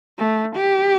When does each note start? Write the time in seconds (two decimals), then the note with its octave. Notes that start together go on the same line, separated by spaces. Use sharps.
0.18 A3
0.56 G4